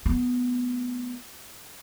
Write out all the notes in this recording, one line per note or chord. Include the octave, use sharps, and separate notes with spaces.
A3 B3